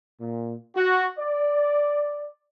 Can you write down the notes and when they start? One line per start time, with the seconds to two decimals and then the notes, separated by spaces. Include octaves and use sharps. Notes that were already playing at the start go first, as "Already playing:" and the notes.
0.20 A#2
0.76 F#4
1.18 D5